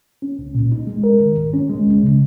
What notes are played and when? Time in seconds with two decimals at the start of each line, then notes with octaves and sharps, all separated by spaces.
0.22 C#4
0.39 C#2
0.55 A#2
0.72 D#4
0.87 G#3
1.04 A#4
1.21 D#3
1.37 G#2
1.53 C#4
1.70 G#3
1.87 C#2
2.03 C#3